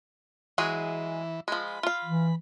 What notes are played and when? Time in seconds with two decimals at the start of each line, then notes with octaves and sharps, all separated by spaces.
0.58 E3 F#3 G#3 G#4
1.48 F3 G#3 B5
1.83 F4 F5
2.05 E3